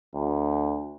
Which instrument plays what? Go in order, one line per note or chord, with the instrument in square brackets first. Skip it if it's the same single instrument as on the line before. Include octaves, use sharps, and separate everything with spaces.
[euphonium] D2